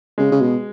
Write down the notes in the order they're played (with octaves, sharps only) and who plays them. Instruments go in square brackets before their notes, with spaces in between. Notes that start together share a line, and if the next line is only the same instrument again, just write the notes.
[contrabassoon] C#3 [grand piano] G#3
[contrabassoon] C#3
B2